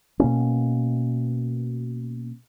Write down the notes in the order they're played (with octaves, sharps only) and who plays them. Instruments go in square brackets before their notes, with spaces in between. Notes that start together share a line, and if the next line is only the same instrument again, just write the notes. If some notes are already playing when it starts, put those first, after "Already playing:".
[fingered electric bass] B2 A#3 C#4